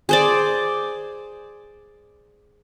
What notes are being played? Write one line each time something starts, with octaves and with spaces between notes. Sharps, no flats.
G#4 C5 D5